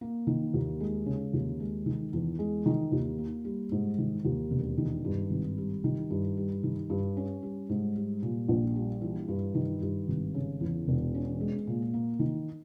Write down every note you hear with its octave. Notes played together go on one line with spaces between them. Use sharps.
A#3
D#3
D#2
G#3
C#3
D#2
G#3
D#3
E2
G#3
D#3
D#2
A#3
G3
G#2
D#3
D#2
E1
D#3
G2
G#1
G3
D#3
G2
G3
D#3
G2
C#4
G3
G#2
G3
A#2
A#1
G3
E3
G2
D#3
G2
G#1
C#3
E2
E1
C#4
G#3
A#2
A#3
D#3